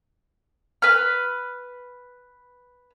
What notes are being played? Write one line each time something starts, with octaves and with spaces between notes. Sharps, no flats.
B4 F6